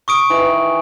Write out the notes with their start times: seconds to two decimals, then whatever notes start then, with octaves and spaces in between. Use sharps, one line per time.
0.08 C#6 D#6 D7
0.30 D#3 E3